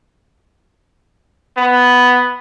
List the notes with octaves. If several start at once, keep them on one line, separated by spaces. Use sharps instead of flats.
B3